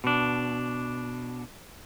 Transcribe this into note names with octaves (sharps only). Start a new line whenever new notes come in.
B2 D4